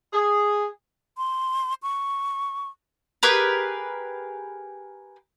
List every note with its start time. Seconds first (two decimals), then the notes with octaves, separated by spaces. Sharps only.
0.12 G#4
1.18 C6
1.83 C#6
3.23 G4 G#4 A#4 B4